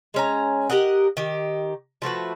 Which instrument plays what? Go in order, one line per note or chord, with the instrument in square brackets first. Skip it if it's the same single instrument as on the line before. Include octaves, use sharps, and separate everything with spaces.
[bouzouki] G#3 C#4 A#5
G4 A#4 D#5 F#5
D#3 G4
F3 A3 F#4 B4